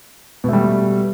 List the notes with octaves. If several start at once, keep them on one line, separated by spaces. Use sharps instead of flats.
B2 G3 A3